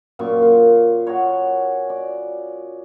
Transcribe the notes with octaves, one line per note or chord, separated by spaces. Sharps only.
F#2 A#2 F4 C#6
F4
F#4 G#4 A#4 C#5
D5